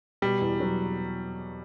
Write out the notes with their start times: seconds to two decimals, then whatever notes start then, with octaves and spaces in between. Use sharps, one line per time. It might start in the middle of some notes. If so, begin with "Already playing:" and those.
0.22 B2 G3
0.41 E2
0.60 F#3